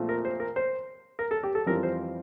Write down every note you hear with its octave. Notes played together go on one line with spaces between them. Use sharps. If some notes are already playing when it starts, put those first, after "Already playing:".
Already playing: A#1 A#2 A3 C4 F4
A#4
C5
A#4
C5
A#4
A4
G4
A4
F2 E3 G3 C4 F4 A#4
C5